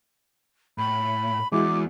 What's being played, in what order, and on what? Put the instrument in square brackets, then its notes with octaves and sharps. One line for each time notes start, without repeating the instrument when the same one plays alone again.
[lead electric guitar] A2 [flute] B5
[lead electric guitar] E2 [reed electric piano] G#3 E4 F#4 [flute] D6